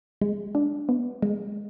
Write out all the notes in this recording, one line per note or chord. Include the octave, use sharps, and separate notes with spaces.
G#3
D4
B3
G#3